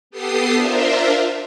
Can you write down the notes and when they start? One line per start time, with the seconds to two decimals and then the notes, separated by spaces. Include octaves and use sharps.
0.11 B3 G4 A4 D#6 C7
0.54 D4 F4 A#4 C5 E5